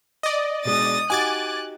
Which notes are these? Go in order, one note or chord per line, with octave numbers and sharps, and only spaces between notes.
D5 D#5
B2 G#3 D4 D#6 A6
D#4 F#4 G4 G#5 D6 F#6 A6